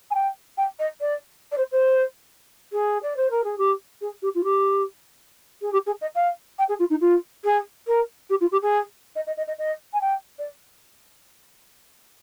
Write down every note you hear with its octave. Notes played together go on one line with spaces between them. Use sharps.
G#5
G5
G5
D#5
D5
D5
C5
C5
G#4
D5
C5
A#4
G#4
G4
G#4
G4
F4
G4
G#4
G4
G#4
D#5
F5
G5
G#4
F4
D#4
F4
G#4
A#4
G4
F4
G4
G#4
D#5
D#5
D#5
D#5
D#5
G#5
G5
D5